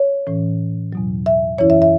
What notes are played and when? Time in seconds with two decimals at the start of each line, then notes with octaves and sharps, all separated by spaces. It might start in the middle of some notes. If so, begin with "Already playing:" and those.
Already playing: C#5
0.27 A2 E3 C#4
0.93 E2 B2 F#3
1.26 E5
1.58 F#2 E3 C#4 E4 C#5
1.70 E5
1.82 E5